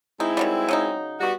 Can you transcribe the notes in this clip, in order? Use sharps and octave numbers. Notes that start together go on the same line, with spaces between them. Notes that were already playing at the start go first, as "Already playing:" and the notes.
G#3 C4 D#4 E4
D#3 F#3 G3
C#3 F#3 D#4
G3 B3 F#4